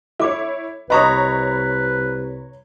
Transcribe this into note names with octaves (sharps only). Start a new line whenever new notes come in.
E4 A4 C#5 D6
C2 B4 C#5 D#5 A#5 B5 C#6 D#6